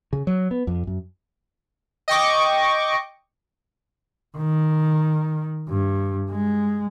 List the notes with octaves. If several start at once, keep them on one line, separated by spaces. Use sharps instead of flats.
C#3
F#3
B3
F2
F#2
D#5 G5 C#6 D6
D#3
G2
G#3